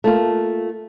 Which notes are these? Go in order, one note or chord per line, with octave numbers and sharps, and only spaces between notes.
A3 A#3 F4